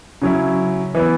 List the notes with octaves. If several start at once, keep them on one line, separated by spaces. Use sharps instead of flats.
C#3 F#3 C#4 E4
E3 B3 E4